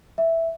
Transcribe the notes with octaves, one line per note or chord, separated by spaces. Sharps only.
E5